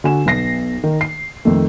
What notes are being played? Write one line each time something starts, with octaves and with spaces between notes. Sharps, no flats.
D3 F#4 G#5 E7
B1 B2 A#6 C7
D#3
C7
F2 D#3 A3